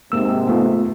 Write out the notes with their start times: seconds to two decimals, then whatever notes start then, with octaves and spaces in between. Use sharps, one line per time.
0.12 G#2 C3 A#3 E6
0.49 A3 B3 F4